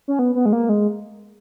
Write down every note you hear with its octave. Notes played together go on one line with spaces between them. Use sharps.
C#4
B3
B3
G#3
A#3
G#3